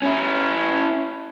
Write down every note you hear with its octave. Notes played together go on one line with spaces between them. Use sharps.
C#4 E4